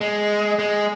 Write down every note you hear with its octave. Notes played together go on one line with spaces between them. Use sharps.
G#3
G#3